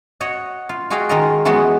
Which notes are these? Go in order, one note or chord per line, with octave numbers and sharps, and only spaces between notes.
F#4 C#5 D#5 F#5
F4
F4 F#4 G#4 D#5 F5 G5
D#3 G#3 F4 A#4 D#5
E3 F#3 G#3 B3 F#4